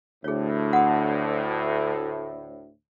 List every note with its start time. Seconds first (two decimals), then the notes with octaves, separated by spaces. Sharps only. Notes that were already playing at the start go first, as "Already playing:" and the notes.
0.24 D2 A2 G#4 C#5
0.73 F#5 C6 D#6